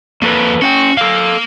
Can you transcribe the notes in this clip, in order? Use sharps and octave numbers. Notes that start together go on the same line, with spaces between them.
F2 A#3 A4 B4
C#4 F#4 F#5 G5
A#3 A4 F5